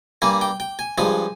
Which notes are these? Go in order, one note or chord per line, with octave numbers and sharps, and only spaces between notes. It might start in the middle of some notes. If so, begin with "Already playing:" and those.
G2 G3 A#3 G#5
G5
G5
G#5
G2 F3 G#3 G#5